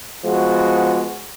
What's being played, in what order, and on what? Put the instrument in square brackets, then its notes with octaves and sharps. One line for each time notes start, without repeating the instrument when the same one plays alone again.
[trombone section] F3 G#3 B3 F#4